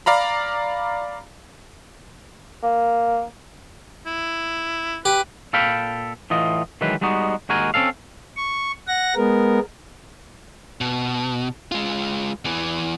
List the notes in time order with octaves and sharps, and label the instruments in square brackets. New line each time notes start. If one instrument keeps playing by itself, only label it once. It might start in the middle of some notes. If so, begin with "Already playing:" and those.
[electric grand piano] D5 F5 A#5 B5
[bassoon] A#3
[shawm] E4
[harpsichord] G4 [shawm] B4
[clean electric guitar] A#2 A4 F5 G5 B5
A2 E3 F4 D#5
D#3 E3 F#3 G#3 B4
G3 G#3 B3 D#4 F#4
D#2 G#3 F#4 A#4 G#5
C4 C#4 A4 F5
[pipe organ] C#6
F#5 A#6
G#3 B3 A#4
[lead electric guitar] B2
G#3 F4
E2 E3